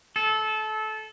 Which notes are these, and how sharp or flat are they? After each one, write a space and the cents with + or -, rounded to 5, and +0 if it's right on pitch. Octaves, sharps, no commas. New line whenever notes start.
A4 -20